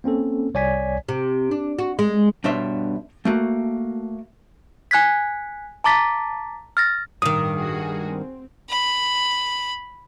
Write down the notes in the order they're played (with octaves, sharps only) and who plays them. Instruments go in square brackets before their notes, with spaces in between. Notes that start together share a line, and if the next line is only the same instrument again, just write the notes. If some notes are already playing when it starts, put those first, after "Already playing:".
[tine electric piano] A#3 C4 C#4 A4
C2 C#5 D5 G#5 G#6 B6
[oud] C3
D4
F#4
G#3
[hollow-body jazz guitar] G2 B2 D4 C#5 E5 C6
A3 A#3 F#4
[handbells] G#5 F#6 G#6 B6
A5 A#5 D6 A6 B6
F6 A6 A#6
[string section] A1 A#4 [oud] G2 D#3 [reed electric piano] D#6
[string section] G3 F#4 G#4
C4
[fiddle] B5